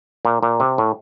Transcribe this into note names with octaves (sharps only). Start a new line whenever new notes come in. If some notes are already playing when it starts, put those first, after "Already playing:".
A#2
A#2
C3
A2